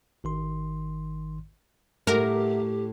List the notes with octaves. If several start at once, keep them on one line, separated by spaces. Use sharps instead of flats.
G#1 D#3 C6
A2 A3 G4 A#4 E5 F#5 D6